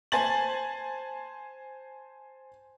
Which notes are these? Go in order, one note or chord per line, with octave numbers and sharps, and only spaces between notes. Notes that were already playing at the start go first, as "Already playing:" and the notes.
C5 G#5 A5 A6 F#7